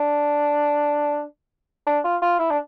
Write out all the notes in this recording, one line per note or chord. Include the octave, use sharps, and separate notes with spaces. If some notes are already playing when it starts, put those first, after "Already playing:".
Already playing: D4
D4
F4
F4
E4
D4